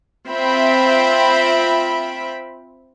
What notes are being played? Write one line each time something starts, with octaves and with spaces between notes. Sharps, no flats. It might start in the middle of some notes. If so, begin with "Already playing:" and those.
C4 F4 E5 G5 B5